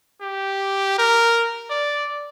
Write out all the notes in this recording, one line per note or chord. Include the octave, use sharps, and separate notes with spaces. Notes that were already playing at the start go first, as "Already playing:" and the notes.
G4
A#4
D5